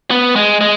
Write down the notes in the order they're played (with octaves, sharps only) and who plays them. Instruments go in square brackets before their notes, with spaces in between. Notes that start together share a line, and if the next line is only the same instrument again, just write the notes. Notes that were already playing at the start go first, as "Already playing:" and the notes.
[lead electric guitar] B3
G#3
G#3